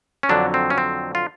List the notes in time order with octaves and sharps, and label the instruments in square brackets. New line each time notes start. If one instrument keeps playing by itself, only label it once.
[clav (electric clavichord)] C#4
F2 D3 F#3 D4
C4
C#4
C4
F4